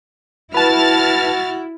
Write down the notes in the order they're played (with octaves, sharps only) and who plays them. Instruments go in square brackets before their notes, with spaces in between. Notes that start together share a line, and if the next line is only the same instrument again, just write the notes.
[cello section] E4 [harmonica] F#4 [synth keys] B4 A5 [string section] F6 A6